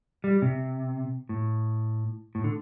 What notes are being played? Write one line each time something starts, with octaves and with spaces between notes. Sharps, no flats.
G3
C3
A2
A2
D3